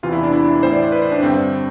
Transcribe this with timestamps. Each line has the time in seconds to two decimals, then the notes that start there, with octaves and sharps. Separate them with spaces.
0.03 E2 C3 E3 F4
0.12 E4
0.23 D4
0.32 E4
0.63 A2 E3 C5
0.72 D5
0.83 C5
0.92 B4
1.02 C5
1.12 D4
1.23 G2 D3 C4